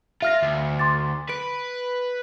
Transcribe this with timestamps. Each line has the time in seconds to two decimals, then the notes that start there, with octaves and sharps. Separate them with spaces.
0.22 F4 E5 F6 A#6
0.42 D2
0.79 C6 D6 A6
1.30 B4 D7